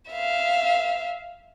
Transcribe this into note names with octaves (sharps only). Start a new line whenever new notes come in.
E5 F5